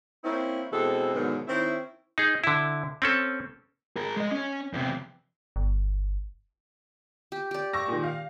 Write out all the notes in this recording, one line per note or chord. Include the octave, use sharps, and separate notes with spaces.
A#3 C4 C#4 E4
B2 E3 G#3 C4 G#4 A4
G#2 B2 D3 D#3 F#3 B3
D#3 C4 C#4 E4
D#4 G#4
D3 E4
C4 C#4 A4
G#4 A#4
G#3 D#5
C#4
E2 C3
G1
G4
G4 D5
C#6 E6 A#6
A#2 D#3
F5